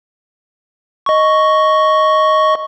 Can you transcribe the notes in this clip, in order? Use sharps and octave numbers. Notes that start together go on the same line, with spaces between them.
D#5 C#6